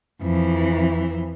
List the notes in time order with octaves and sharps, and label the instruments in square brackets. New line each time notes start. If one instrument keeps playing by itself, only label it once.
[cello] F2 E3